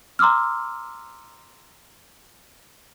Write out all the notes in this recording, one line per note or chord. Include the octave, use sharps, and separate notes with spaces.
A#5 C6 D6 E6 F6